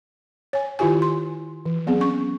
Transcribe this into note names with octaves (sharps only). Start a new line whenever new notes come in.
C#5 G#5
D#3 E4 F4 G4 G#5
C6
E3
F#3 B3 C4 G#4
C#4 C#6